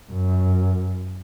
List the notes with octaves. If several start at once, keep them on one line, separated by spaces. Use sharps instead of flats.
F#2